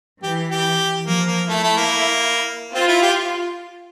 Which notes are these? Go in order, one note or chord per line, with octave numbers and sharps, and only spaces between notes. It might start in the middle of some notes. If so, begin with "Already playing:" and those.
E3 G4
G4
F3 A#3
A#3
A3 E4
A3
A#3
C4 F4
E4
G4